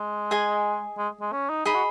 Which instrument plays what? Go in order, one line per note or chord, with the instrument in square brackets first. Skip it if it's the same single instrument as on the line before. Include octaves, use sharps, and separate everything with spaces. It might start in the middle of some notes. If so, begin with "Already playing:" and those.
Already playing: [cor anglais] G#3
[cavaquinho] G#4 D#5 G#5
[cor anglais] G#3
G#3
C#4
D#4
[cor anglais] D#4 [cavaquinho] G#4 D#5 B5
[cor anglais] F#4